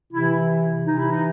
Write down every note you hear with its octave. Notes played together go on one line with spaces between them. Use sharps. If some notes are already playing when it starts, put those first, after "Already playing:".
C3 E3 E4
C3 E3 D#4
E4
D#4